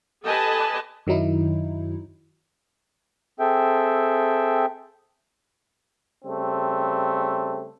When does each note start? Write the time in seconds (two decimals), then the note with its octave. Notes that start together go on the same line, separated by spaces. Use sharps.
0.24 G4 A4 B4 D#5 G#5 A5
1.07 F#2 D#3 F#3 D#4 E4
3.40 C4 G#4 A4 E5 G5
6.25 C#3 G3 A3 C4